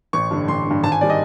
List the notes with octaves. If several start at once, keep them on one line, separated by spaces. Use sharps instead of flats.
A1 C#6
G2 D3
A1 C6
G2 D3
G#1 A5
G#5
D#3 G3 D5
D#5